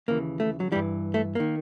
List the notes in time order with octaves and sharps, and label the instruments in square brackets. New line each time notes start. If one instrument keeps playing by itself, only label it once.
[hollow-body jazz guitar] D#2 C#3 E3 A#3
A3
F#3
E3 G3
G2
A3
D#3 A#3